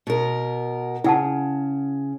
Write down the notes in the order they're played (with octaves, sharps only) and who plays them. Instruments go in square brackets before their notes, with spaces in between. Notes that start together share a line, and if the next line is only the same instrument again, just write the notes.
[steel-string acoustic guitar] B2 A#4
[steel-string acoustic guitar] C#3 [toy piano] E4 F#5 A5